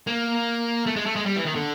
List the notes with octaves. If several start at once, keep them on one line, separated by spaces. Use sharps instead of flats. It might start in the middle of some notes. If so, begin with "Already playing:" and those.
A#3
A3
G#3
A3
G#3
G3
E3
D#3
D3